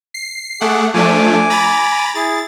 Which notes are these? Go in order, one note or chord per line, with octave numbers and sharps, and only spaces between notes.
C7
A3 G#4 F#5 D6
F3 A3 D4 G#5 D6
A#5 B5 A6
E4 G#4 A6